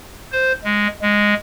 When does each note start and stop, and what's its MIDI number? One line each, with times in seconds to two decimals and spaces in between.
0.32 0.53 72
0.64 0.87 56
1.02 1.34 56